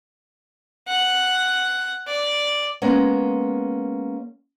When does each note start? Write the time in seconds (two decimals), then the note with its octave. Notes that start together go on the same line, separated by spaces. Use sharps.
0.88 F#5
2.08 D5
2.82 G#3 A#3 B3 C#4